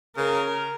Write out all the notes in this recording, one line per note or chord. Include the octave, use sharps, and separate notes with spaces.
C#3 A#4